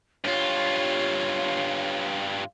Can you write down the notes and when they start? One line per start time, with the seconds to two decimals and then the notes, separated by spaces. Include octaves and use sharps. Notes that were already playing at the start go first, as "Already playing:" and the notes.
0.25 G2 F4 C#5